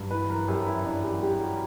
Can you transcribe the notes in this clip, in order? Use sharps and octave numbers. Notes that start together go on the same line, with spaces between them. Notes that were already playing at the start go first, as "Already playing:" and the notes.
Already playing: G2 F#3
E3 B4
A#4
F#2 G4
E4
F#2 D4
G4
G3 G4
F#4